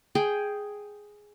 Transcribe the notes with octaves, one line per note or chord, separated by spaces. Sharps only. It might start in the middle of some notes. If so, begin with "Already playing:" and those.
G#4 G5